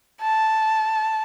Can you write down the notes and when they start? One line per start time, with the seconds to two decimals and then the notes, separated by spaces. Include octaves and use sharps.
0.21 A5